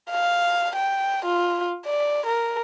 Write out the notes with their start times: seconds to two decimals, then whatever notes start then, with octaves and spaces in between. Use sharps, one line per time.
0.10 F5
0.75 G5
1.25 F4
1.86 D5
2.26 A#4